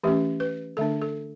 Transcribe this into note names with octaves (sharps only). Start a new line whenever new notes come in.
E3 A3 C#4 G4
B4
D3 A3 D4 A4
A4